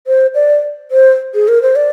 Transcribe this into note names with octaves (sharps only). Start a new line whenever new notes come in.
C5
D5
C5
G#4
A#4
C5
D5